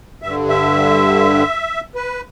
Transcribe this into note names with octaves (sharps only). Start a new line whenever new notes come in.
G2 D3 E5
E5
B4